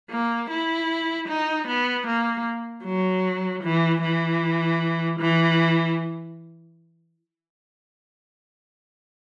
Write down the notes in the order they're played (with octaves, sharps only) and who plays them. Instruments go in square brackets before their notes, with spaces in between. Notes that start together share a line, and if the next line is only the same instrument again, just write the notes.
[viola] A#3
E4
D#4
B3
A#3
F#3
E3
E3
E3